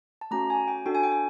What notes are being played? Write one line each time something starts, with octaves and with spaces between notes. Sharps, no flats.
A5
A3 C#4 F#4 A#5
G#5
G5
D4 F#4 A4 G5
G#5
G5
G#5